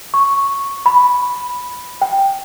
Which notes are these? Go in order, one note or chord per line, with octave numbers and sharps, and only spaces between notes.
C#6
B5
G5